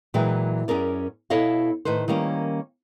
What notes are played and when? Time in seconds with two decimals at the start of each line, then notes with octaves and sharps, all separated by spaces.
0.14 A#2 E3 F#3 G#3 G#4 G5
0.68 F#2 C#4 G#4 A#4 D5
1.30 B2 E4 A4 C#5 D#5 F5
1.85 A2 D#3 B4 C5
2.08 D#3 G3 A#3 C#4